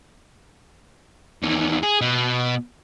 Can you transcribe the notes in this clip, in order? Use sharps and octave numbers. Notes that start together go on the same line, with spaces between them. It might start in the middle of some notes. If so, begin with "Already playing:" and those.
E2 D#3
G#4
B2